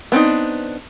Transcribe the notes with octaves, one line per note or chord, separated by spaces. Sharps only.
B3 C4 D4 D#4